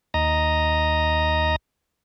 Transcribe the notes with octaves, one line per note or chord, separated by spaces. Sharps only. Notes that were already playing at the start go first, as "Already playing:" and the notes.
D#2 D#5 A#5